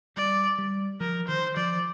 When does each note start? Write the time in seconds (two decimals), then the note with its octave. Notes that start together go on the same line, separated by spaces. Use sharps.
0.16 G3 D5
0.58 G3
1.00 F3 A#4
1.28 D#3 C5
1.56 F3 D5